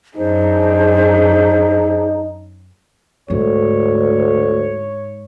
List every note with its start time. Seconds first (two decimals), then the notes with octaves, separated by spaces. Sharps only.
0.17 F#2 D4 D#4 G#4 C5
3.30 D2 G#2 C#5